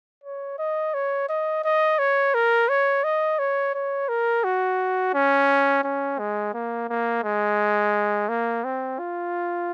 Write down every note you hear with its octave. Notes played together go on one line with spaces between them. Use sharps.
C#5
D#5
C#5
D#5
D#5
C#5
A#4
C#5
D#5
C#5
C#5
A#4
F#4
C#4
C#4
G#3
A#3
A#3
G#3
A#3
C4
F4